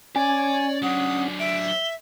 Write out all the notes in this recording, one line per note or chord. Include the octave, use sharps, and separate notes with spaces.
C#4 C#5 D5 G#5
F#3 D4 F#5 D#6
E5 D7
G7